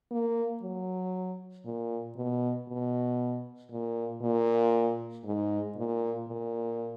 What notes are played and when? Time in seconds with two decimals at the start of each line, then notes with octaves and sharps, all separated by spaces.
0.11 A#3
0.62 F#3
1.65 A#2
2.16 B2
2.68 B2
3.71 A#2
4.22 A#2
5.24 G#2
5.76 A#2
6.27 A#2